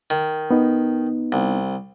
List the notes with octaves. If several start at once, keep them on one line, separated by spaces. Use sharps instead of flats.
D#3
B3 D#4
C2